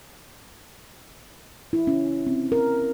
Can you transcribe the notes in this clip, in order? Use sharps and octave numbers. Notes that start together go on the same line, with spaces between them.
E4
C#4
C4
A#4